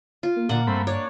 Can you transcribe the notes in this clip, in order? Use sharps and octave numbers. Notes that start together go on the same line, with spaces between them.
F4
A#3
A#2 D3 A#3 F#5
G2 A3 C4 B5
D4 C#5